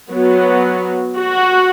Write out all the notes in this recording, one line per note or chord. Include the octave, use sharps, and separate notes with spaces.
F#3 B3
F#4